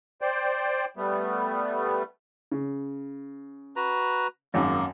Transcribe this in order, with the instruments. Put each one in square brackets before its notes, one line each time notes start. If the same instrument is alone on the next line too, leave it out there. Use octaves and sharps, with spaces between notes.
[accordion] C5 D5 G5
G3 A3 B3
[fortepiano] C#3
[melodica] F#4 B4 A#5
[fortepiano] G#1 F#2 [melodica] A#3